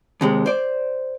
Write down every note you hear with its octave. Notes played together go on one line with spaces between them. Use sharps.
D#2 C3 G#3
C5 D5